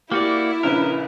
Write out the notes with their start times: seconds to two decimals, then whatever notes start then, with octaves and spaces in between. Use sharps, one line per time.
0.12 A#3 E4 F#4 G4 D5
0.63 A#1 C#3 A#4 B4